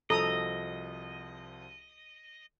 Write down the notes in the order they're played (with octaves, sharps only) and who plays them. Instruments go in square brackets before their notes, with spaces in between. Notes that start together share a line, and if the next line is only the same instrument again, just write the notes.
[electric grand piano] C2 F3 F#4 [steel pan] A4 A#5 D#6 [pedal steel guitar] D#5